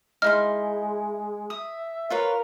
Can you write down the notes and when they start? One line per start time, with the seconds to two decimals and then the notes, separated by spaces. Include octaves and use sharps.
0.22 G#3 D#4 E4 C6 F6
1.50 E5 D#6
2.10 F4 A#4 B4 C#5